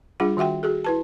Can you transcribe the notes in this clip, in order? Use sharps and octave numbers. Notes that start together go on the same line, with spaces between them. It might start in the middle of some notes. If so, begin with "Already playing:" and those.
G3 D4 F4 G#4 F#5
D#3 F#4 E5 F#5 G5
F#4 G#4 A4
E4 B4 A5